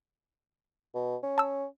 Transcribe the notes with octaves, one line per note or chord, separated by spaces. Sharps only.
B2
C#4
A5 E6